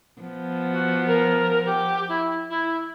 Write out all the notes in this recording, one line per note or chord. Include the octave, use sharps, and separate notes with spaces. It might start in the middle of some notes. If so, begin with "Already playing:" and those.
F3 B3
F#4
A#4
G4
E4
E4